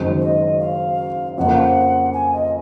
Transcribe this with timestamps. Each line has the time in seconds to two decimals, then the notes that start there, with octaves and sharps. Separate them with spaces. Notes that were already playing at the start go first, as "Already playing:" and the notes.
Already playing: F#1 F#2 D#3 G#3 C4
0.21 D#5
0.60 F5
1.38 F2 C#3 F3 A#3 F#5
2.13 G#5
2.33 D#5